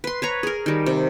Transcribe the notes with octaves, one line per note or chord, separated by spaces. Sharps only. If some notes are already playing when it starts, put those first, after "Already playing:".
B4 C6
B4 C#5 A#5
G#4 A#4
D#3 G3
C3